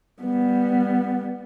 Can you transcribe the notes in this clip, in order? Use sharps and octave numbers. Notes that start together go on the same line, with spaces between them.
G3 B3